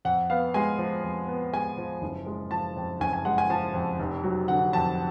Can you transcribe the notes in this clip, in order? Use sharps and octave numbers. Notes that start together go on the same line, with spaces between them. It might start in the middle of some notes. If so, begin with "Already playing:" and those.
F2 F#5
B3 F5
G#3 G#5
F3
F2
B3
G#3 G#5
F3
F#1
G#3
F3 A5
F2
F#1 G#5
G#5
G#3 F#5
G#5
F3 A5
F2
F1
F#3
D3 F#5
F2 A5